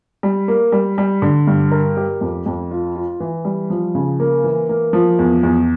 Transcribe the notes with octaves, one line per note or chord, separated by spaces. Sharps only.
G3
A#3
G3
G3
D3
G2
A#4
G4
F2
F2
F4
F4
E3
G3
F3
C#3
A#3
E3
A#3
F3
E2
E2